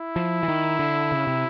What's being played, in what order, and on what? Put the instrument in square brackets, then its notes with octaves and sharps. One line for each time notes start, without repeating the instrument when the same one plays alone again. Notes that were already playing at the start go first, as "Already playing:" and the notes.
Already playing: [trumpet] E4
[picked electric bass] F3
E3
D#3
D3
C#3
C3